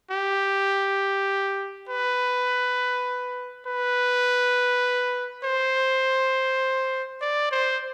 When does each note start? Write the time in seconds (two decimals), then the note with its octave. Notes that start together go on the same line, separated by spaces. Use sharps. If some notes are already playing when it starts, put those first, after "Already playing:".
0.11 G4
1.89 B4
3.67 B4
5.44 C5
7.22 D5
7.51 C5